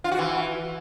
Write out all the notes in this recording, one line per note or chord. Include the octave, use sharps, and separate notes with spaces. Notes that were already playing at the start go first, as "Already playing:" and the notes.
F4
F#4
E3